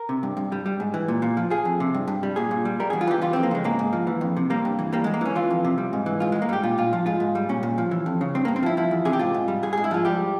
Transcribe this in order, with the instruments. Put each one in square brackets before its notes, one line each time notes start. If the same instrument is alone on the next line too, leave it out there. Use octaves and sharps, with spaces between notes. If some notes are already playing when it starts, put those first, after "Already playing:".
Already playing: [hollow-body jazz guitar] A#4
C3
G2
G2
G3
G3
G#2
E3
A#2
A#2
F3
F3 G#4
F2
C3
G2
G2
G3
A#2 G#4
A#2
G3
G3 A#4
E2 G#4
F4
E3 G4
E3 F4
F2 C4
A#3
C#3 G#3
G#2 A#3
G#2
F3
E3
F2
C3
G3 A#3
G2
E3
G3 A#3
E2 G#3
A#3
E3 C#4
E3 F4
F2
C3
G3
G#2
E3
G#2 F4
G#2 G#3
A#3
G3 G4
A#2 F4
A#2 F4
F3
G#2 F4
G#2
G3
A#2 C#4
A#2
F3
E3
F2
C#3
G2 C4
G2 A#3
C4
F3 E4
F3 E4
E2
C3 G#4
G4
G#2 F4
G#2
G3
G#2 G#4
G#2 G#4
E4
F3 F4
G3 G4